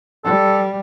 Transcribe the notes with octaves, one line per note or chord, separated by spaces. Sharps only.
G3 A4